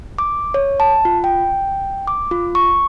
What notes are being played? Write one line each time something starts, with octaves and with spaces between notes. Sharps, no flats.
D6
C#5
A5
F4
G5
D6
F4
C#6